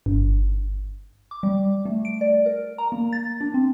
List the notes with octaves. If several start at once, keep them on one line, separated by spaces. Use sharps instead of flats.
G1
D6
G3
A3
D7
D5
A#4
A#5
A#3
A6
D4
C4